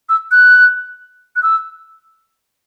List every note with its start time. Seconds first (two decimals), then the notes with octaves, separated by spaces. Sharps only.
0.09 E6
0.31 F#6
1.36 F#6
1.43 E6